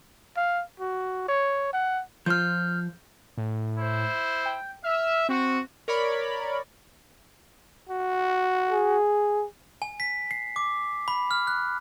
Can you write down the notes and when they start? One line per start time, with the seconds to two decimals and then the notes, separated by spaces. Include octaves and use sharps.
0.37 F5
0.80 F#4
1.28 C#5
1.73 F#5
2.26 F3 F4 C5 F6 G6
3.37 A2
3.78 E4 C5
4.46 G5
4.84 E5 F6
5.29 C4 F#4
5.88 A#4 C#5 D5 B5
7.89 F#4
8.70 G#4
9.82 G#5
10.00 B6
10.31 C7
10.56 D6
11.08 B5
11.31 F6
11.47 F#6